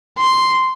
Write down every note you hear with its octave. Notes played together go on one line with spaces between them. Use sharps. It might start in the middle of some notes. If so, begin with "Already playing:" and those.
C6